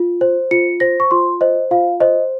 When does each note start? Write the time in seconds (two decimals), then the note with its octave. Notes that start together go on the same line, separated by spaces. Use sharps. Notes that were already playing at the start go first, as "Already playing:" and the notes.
Already playing: F4
0.21 C5
0.51 F4 C#7
0.80 C5 A#6
1.00 C#6
1.11 F4 C6
1.41 C5 D#5
1.71 F4 F5
2.00 C5 D#5